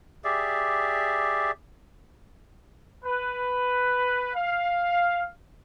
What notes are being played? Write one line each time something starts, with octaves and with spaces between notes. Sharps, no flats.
G4 G#4 D5 E5
B4
F5